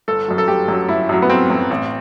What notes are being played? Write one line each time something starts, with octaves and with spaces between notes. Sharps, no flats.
G1 A4
F#2 F#3
A4
G1 G4
F#2 F#3
G1 E4
F#2 F#3
B3
G1 C4
F#2 F#3
A1